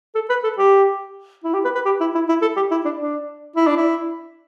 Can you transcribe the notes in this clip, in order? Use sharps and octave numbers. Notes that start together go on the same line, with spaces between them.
A4
B4
A4
G4
E4
G4
B4
B4
G4
E4
E4
E4
A4
G4
E4
D4
D4
E4
D4
E4